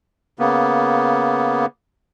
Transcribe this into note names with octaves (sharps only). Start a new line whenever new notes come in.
C#3 A#3 B3